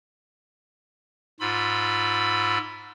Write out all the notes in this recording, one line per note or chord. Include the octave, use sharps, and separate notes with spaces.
G#2 F4 B5 E6